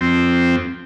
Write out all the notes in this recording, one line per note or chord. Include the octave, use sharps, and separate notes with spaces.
F2 C4